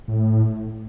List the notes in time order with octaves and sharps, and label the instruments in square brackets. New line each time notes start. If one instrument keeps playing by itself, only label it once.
[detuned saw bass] A2